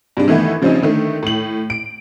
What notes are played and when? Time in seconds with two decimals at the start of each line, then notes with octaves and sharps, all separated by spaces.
0.17 G2 C3 G#3 D4
0.28 D#3 E3 A3 B3 E4
0.62 C#3 F3 G3 C4 C#4 D#4
0.83 D3 D#3 A3
1.23 A2 F#7
1.70 D7